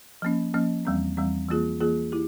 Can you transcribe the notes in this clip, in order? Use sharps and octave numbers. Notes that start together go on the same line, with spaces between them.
F3 A#3 C#4
F3 A#3 C#4
E2 E3 G3 C4
E2 E3 G3 C4
E3 A#3 F4 G#4
E3 A#3 F4 G#4
E4 G4